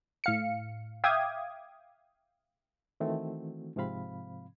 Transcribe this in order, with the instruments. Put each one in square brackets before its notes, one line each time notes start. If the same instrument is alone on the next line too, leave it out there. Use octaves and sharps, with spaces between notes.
[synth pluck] A2 F5 C#7
E5 F5 G5 D6 D#6 G#6
[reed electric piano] D#3 E3 A3 C4 F#4
G#2 C3 F3 C4 F5 B5